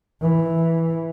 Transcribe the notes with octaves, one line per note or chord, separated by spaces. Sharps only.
E3